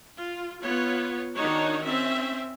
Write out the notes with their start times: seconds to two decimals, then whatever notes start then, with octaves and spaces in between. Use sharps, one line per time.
0.19 F4
0.64 B3 F4 C#5
1.36 D#3 D4 D#4 F#4 C#5
1.85 C4 C#4 E5